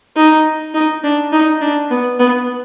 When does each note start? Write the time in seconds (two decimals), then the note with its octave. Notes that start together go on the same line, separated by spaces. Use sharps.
0.16 D#4
0.74 D#4
1.04 D4
1.33 D#4
1.61 D4
1.91 B3
2.19 B3